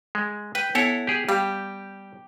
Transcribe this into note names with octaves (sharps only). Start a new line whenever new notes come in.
G#3
B4 G5
B3 E4 A4 C#5 F#5
G4 G#4
G3 G4 F5